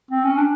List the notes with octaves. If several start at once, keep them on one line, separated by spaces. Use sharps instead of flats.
C4
C#4
D4